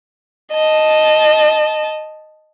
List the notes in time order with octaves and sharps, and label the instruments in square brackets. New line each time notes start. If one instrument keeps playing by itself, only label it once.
[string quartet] D#5 A5